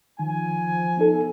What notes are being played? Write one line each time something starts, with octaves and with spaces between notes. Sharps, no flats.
D#3 F3 G#5
B3 D#4 A4